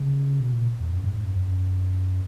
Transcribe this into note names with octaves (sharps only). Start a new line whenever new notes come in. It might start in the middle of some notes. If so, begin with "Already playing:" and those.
Already playing: C#3
B2
A#2
E2
F#2
G#2
G#2
F#2
F#2